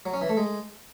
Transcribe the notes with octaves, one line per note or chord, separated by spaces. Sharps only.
F#3
C#4
E3
A3
G#3